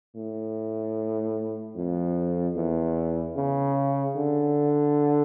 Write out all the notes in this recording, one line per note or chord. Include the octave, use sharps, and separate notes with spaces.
A2
F2
E2
C#3
D3